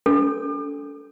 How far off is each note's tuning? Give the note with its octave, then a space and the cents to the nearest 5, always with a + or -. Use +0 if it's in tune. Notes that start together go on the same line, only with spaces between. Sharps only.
D4 -45 A4 +0